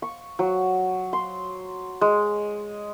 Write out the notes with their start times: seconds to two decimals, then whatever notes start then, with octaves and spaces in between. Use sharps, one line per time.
0.02 C#6
0.39 F#3
1.13 C6
2.01 G#3